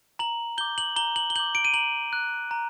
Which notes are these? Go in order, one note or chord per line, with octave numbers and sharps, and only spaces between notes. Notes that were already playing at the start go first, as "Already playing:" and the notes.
A#5 F#7
D6 G6 G7
F#7
A#5 G7
F#7
G7
D6 G6 F#7
D7
D#7
A#5 F#7
F#6
A#5